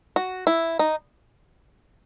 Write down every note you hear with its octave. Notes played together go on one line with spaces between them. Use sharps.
F#4
E4
D#4